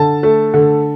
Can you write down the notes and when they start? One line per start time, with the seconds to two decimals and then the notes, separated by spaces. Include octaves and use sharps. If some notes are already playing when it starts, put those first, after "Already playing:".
Already playing: D3 A5
0.23 A3
0.54 D3